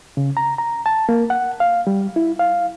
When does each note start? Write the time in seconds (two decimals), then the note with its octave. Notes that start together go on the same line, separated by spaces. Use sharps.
0.17 C#3
0.37 A#5
0.58 A#5
0.86 A5
1.09 A#3
1.30 F#5
1.60 F5
1.87 G3
2.16 E4
2.39 F5